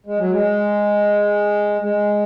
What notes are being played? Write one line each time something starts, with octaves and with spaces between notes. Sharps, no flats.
G#3
F#3
G#3
G#3